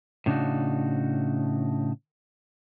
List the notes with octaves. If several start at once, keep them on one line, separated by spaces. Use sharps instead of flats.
A2 C#3 D4 D#4 F#4